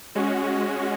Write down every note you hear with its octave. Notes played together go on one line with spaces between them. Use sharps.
G#3 C#4 F#4